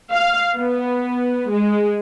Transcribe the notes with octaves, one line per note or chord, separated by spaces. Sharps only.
F5
B3
G#3